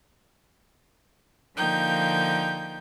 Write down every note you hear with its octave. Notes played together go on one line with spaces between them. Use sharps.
D3 F3 A#3 D#4 G5 G6